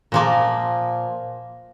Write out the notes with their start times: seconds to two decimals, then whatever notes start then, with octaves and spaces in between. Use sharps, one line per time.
0.12 A#2 F3 A#3